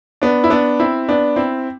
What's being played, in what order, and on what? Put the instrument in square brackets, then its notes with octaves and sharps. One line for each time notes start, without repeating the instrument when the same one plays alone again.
[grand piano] B3 D4
E4
B3 D4
C4 E4
B3 D4
C4 E4